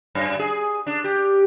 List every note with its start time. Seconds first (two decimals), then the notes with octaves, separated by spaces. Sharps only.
0.15 F#2
0.39 G#4
0.87 D4
1.04 G4